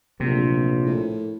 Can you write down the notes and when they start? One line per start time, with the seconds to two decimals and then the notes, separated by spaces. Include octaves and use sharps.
0.20 D1 A#1 C3
0.86 A2